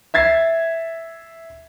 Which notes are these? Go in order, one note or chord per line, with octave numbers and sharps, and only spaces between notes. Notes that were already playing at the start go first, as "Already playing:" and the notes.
E5 G#6 A6 C7